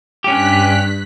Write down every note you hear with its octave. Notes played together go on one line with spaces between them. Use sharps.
G2 C#4 G4 F#6 B6